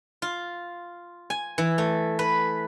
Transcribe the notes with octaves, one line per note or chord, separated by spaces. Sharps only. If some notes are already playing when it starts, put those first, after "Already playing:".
F4
G#5
E3
A3
B4